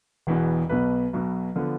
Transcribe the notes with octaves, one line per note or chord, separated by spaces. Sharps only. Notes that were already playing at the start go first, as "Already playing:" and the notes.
E1 E2 B2 B3
B1 B2 B3 B4
B1 B2 B3
D3 F3 B3